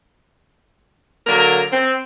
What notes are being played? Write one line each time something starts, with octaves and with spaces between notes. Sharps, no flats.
D3 F#3 A#3 A#4
C4